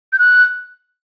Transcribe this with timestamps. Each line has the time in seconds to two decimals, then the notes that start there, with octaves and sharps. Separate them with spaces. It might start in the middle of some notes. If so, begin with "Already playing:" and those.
0.13 G6
0.19 F#6